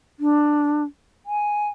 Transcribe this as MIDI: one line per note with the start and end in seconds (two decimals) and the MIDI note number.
0.20 0.83 62
1.26 1.68 80